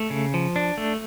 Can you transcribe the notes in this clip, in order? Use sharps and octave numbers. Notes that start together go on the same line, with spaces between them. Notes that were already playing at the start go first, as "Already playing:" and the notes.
Already playing: A3
C#3
F3
D4
A3